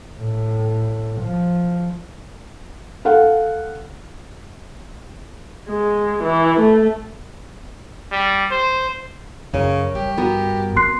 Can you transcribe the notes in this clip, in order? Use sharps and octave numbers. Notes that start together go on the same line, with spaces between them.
A2
F3
A4 F5 F#5
G#3
E3
A3
G3
C5
F#2 C#3 A#4 C#5
G2 G4
B3 F#4 A#4
C4 C6 F#6 C7